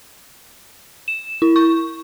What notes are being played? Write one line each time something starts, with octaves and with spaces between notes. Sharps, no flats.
E7
E4
C#6